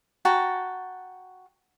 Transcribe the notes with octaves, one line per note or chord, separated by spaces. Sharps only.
F#4 G5 A5 A#5